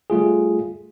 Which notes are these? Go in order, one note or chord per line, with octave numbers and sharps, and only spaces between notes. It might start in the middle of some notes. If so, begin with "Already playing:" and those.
G3 A3 F4 G#4